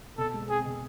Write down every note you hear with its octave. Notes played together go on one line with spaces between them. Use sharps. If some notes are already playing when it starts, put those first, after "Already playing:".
B2 A4
G#3
C4 G#4
B2